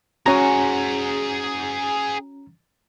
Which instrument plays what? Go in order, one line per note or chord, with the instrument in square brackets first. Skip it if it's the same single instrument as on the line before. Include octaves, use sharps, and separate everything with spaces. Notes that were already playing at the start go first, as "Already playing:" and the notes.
[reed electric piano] C#4 A#5 [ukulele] F#4 G#5 [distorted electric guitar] G#4 F#5